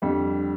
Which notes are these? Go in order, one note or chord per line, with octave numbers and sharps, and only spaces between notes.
F2 D3 G3